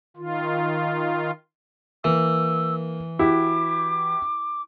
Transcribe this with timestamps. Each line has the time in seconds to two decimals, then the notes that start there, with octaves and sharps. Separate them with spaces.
0.17 D#3 F4
2.04 E3 A#3 E6
3.19 E4 F#4 G4 D6